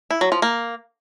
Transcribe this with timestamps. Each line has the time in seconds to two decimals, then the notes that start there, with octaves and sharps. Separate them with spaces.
0.11 E4
0.21 F#3
0.32 F3
0.42 A#3